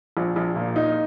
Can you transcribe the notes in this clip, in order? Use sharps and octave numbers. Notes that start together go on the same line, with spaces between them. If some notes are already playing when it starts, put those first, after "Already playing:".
A#1
A#1
A#2
D#4